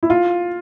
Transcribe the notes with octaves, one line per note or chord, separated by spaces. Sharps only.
E4
F4